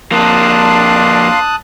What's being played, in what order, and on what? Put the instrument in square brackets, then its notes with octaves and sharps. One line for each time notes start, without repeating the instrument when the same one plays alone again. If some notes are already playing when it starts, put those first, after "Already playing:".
[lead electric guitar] F2 A#3 [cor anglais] D4 [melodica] F5 C6 [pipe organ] A5 D#6 F#6